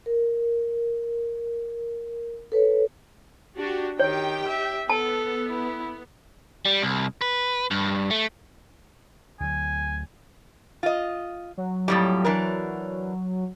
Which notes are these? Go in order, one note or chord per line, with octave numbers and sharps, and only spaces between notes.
A#4
A4 B4 C#5
D4 F#4 G4
D#3 G4 C#5 G5
E5
B3 A4 A5
E4
G3
C2
B4
G2
A3
D2 F#3 G#5
F4 D#5
F#3
F2 A2 G3
E3 D4 A#4